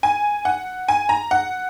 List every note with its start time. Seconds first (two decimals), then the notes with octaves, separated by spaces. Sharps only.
0.03 G#5
0.45 F#5
0.88 G#5
1.09 A#5
1.31 F#5